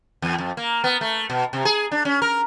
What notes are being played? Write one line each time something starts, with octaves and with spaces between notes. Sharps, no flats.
E2
F2
A#3
B3
A3
B2
C3
G#4
D4
C#4
A#4